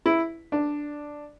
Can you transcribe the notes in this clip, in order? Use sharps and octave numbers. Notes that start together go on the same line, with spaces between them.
E4
D4